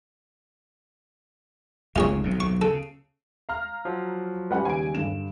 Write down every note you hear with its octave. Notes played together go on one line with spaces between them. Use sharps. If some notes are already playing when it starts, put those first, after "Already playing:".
F1 C#2 C#3 F4 G#4 C#5
B1 C3
C#6
C#3 A4
F5 A#5 F6
F3 F#3
G3 C#4 G4 B4 F#5
D#2 C#3 G#5 D7
G2 D3 E7